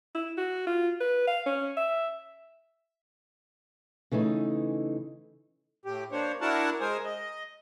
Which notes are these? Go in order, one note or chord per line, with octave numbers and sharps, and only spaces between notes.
E4
F#4
F4
B4
F5
C#4
E5
C#3 E3 A3 D#4
A2 G4
A#3 D4 C5 C#5
D4 E4 F#4 A#4 F#5 A5
G#3 A#4 C5 G#5 D#6
D#5